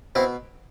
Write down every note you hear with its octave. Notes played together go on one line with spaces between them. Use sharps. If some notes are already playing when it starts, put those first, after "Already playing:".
B2 C4 E4